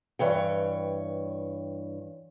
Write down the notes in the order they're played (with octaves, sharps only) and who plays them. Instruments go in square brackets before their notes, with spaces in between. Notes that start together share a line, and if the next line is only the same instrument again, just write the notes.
[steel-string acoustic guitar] G2 E3 C#5 G5